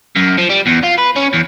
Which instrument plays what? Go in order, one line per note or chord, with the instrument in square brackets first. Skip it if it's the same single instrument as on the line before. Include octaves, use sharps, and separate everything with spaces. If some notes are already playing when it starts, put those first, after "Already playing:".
[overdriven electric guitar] F#2
F3
G3
E2
F4
B4
C#4
E2